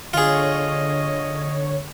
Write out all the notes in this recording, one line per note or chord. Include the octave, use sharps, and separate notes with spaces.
D3 F4 G#4 C#5 D#5